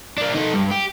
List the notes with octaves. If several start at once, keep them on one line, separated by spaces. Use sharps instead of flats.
A#3 D4
D#4 A4
G2
G4